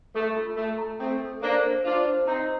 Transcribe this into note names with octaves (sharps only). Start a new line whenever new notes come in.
A3 A4
F4
A3 A4
A#5
A3 C4 A4
A4
A#3 D4 C5
C5
D4 F4 C5
C5
C4 D#4 A#5